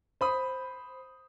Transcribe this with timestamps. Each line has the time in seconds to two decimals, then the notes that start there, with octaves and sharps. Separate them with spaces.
0.21 C5 B5 D#6